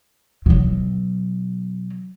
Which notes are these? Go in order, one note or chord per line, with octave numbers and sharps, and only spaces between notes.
B2 F#3